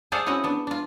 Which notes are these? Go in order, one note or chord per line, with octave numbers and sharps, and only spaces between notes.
G#4 A4 C5 D5 F5 F#5
C4 C#4 E4 F#4 D#5 F#5
B3 D4
D4 F4